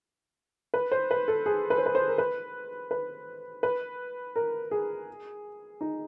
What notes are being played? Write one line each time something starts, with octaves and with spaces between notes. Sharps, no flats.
B4
C5
B4
A4
G#4
B4
C5
B4
C5
A#4
B4
B4
B4
A#4
G#4
D#4